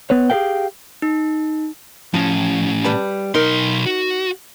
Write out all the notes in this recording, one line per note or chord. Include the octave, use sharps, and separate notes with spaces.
B3 B4 C#5
G4 G#4 A#4 B4 F5 G5
D#4
A2 F3 C#4
G3 B4 A5
B1 D#4 A#4 C6
F#4